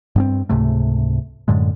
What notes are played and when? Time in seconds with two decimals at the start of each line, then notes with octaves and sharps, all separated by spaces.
0.16 G2 B3 C4
0.49 C#2 G#2 C3 A3
1.48 F#2 A2 D3 G#3